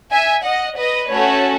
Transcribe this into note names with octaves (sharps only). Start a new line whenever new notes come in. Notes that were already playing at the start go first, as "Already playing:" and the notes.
E5 G#5
D#5 F#5
B4 D#5
A3 C#4 F#4 A4 C#5